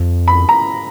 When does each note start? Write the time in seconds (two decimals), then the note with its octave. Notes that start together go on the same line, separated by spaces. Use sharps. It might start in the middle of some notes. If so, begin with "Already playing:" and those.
Already playing: F2
0.28 B5
0.49 A#5